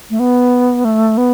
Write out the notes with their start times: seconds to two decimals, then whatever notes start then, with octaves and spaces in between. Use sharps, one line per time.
0.10 A3
0.19 B3
0.85 A3
1.18 B3